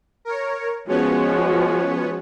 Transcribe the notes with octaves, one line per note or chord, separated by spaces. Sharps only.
A#4 C#5
F3 G#3 B3 C#4 F#4 C#5